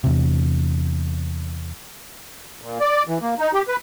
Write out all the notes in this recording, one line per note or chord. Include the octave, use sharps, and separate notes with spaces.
E2 C3
A#2
D5
E3
A#3
D#4
G4
B4